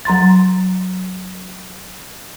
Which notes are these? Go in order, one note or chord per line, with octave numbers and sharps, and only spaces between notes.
F#3 A#5 C6 A6